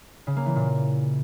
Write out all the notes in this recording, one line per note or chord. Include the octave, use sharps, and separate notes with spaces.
C#3
A#3
E3
A#2